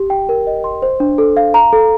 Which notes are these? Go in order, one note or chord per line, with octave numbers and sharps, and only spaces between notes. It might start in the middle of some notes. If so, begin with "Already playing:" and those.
Already playing: G4
G5
A#4
D#5
C6
C5
D4
A4
F5
A#5
A4